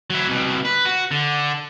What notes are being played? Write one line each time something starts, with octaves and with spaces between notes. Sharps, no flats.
F#3 E4
C2 B2
B4
F#4
D3